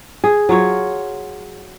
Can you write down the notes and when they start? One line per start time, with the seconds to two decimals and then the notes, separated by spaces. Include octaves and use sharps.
0.24 G#4
0.49 F#3 F4 C#5